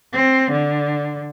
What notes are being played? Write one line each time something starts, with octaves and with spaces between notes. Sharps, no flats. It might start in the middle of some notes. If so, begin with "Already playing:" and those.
C4
D3